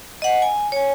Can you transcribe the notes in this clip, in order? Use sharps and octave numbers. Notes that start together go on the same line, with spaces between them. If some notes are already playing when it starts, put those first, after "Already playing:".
D#5 F#5
G#5
C#5 G#5